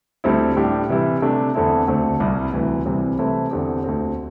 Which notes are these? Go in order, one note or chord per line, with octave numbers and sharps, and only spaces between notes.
D2 D3 G3 C4 E4
A2 G3 D4 G4
C3 E3 G3 E4
C3 A3 D4 G4
E2 D3 A3 C4 E4
D2 D3 A3 C4
C2 C3 G3 E4 G4
D2 C3 E3
C2 C3 E3 G3 C4
C3 E3 A3 C4 E4
E2 D3 C4 G4
D2 D3 C4